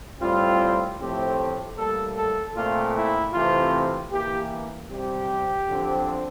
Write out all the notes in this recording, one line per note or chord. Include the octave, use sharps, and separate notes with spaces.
A2 G3 C4 F4
A2 F3 A3 C4 G4
A2 G3 A#3 A4
A4
A#2 A3 C4 F4
E4
C3 E3 A3 C4 F4
E3 A#3 G4
C3 G3 C4 G4
D3 F3 C4